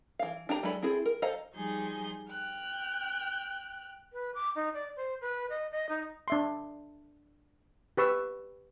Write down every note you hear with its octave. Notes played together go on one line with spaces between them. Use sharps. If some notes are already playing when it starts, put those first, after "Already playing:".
E3 F5
D4 G4 A#5
F#3 G#3 D4 A4 B5
C4 E4 G#4 A4
A#4
A4 C5 D#5 F5 A#5
F3 G3 D#4 G#4 G6
G5 F6 F#6
B4
D6
D#4
D5
C5
B4
D#5
D#5
D#4
D4 E5 C6
G4 B4 C#6 E6